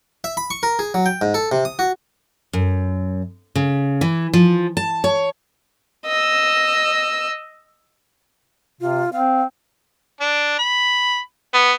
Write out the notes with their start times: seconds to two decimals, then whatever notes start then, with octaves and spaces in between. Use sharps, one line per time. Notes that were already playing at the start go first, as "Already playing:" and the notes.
0.24 E5
0.37 B5
0.50 C#6
0.63 A#4
0.79 G#4
0.94 F#3
1.06 G5
1.21 G#2
1.34 A4
1.52 C3
1.65 D#6
1.79 F#4
2.53 F#2
3.55 C#3
4.01 E3
4.33 F3
4.77 A5
5.04 C#5
6.06 D#5 E6
8.81 C3 F4
9.13 C4 F5
10.20 D4
10.59 B5
11.54 B3